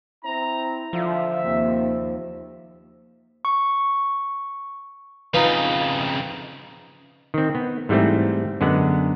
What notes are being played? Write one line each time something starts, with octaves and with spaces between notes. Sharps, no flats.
C4 E4 A#5
D3 F3 F4 E5
D#2 C3
C#6
F2 C#3 D#4 F4 B4
D#3 C4
B3
G#2 E3 G3 A3 C4
F#2 D3 G#3 B3 F#5